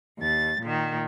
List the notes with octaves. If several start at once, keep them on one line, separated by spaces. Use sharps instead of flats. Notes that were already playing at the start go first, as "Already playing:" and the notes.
D#2 A6
A#2 D#3